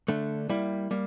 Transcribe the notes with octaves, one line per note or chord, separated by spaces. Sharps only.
D3 A3 D4
G3 A#3 E4
G3 A#3